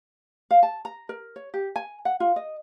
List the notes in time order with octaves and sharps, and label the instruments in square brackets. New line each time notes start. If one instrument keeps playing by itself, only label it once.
[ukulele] F5
A5
A#5
A#4
C#5
G4
G#5
F#5
F4
D#5